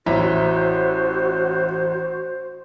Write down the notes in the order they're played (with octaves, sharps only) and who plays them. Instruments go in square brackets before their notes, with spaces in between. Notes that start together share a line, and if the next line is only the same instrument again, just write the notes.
[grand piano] A1 A#5 B6 [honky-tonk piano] E4 [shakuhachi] F#4 [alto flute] C5